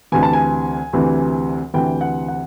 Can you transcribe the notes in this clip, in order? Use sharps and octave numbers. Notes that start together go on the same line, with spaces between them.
D2 C3 E3 G#5
A5
G#5
D2 C3 E3
D2 C3 E3 G5
F#5
F#5